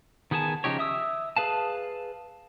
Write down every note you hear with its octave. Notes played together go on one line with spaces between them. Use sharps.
D#3 B3 G#4 G#5 A5
C#3 F3 D#4 G4 C#5
E5 D#6 E6
G#4 B4 F5 A5